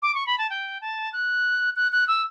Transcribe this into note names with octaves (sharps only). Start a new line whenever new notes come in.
D6
C#6
B5
A5
G5
A5
F#6
F#6
F#6
E6